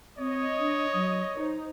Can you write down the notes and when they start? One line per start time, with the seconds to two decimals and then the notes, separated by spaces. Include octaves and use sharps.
0.19 C4 C#5 D#5
0.59 D4
0.94 F#3
1.39 D#4 C5